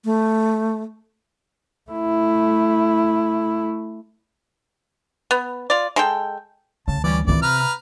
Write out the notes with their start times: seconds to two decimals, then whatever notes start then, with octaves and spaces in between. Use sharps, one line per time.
0.05 A3
1.91 A3 E4
5.31 B3
5.70 F4 D5
5.96 G#3 A4 G5
6.88 D2 C#3 A5
7.04 E3 F3 G3 C#4 D5
7.27 C#2 D#3 E3 C4 F4 D5
7.43 C3 B4 A#5 F6